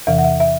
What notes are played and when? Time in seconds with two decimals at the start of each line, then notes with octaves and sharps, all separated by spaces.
0.07 E2 C3 E3 E5
0.18 F#5
0.24 E5
0.40 E5